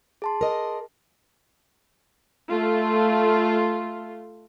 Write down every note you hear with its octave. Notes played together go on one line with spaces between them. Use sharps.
G#4 A5 C6
A#4 D#5
A3 F4